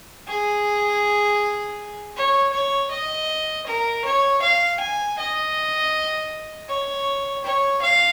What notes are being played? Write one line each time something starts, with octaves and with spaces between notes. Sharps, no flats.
G#4
C#5
C#5
D#5
A#4
C#5
F5
G#5
D#5
C#5
C#5
F5